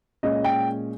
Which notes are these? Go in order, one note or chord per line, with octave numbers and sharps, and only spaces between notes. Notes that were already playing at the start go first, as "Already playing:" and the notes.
A#2 G#3 C#4 D#5
G5